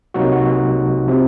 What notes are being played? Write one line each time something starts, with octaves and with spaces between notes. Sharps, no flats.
C2 C3 F#3 A#3 D#4 F#4
F#4
C3 F3 C4